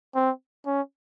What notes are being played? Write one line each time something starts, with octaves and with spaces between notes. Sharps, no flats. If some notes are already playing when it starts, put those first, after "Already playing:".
C4
C#4